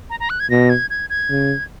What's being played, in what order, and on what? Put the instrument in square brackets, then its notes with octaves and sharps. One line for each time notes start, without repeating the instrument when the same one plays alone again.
[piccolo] A#5
A#5
F#6
G#6
[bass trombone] B2 [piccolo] A#6
[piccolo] G#6
G#6
G#6
[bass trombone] C#3